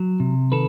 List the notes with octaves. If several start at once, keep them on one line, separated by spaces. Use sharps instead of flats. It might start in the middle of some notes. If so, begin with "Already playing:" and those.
Already playing: F#3
C3
D#3 A4 B4